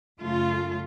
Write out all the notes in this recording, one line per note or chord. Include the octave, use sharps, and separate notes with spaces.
F#2 C#3 A3 F4